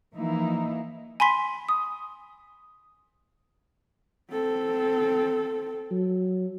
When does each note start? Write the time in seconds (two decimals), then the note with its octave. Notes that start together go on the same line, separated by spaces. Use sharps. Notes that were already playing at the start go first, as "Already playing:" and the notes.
0.16 E3 F3 A#3 D#4 E4
1.20 G#5 B5 C6 B6
1.69 D#6
4.31 C4 A4
5.91 F#3